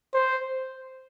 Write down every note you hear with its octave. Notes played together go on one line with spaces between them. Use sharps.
C5